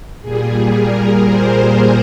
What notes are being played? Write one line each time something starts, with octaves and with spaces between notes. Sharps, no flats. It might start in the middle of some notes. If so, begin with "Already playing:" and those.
A#2 G3 G#4
A#4
C5